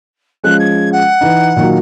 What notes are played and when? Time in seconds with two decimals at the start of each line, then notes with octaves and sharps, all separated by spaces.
0.44 F3 G#3 C#4 F#6
0.59 G#6
0.92 F#5
1.21 E3 D#4
1.56 A#2 D#3 F#3